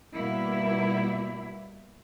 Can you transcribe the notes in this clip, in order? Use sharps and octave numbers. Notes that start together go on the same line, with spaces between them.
B2 G3 A#3 E4